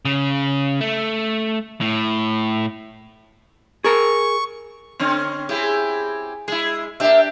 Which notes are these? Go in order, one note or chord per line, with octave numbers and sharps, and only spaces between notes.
C#3
A3
A2
G#4 A#4 C#6
D3 C4 C#4
C4 E4 G4 G#4
G#3 E4 G#4
A#3 D4 G4 E5